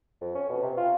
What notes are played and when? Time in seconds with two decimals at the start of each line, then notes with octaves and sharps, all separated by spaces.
0.21 F2
0.35 C#4
0.49 B2
0.62 C3
0.77 F4